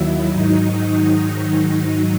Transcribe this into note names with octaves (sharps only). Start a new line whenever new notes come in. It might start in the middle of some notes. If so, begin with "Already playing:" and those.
Already playing: D#2 D#3 F#3 E4
G#2 D#3 F#3 D#4